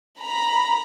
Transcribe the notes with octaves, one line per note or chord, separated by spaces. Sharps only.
A#5 B5